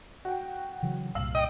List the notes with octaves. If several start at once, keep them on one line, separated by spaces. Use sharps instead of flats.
F#4 G5
C#3 E3 F#3
C2 G2 A#2 F5 E6 F#7
D#5 G5 D7